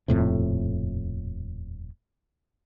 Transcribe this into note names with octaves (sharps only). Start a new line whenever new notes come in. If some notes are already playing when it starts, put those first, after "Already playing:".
D#1 F2 A2 C3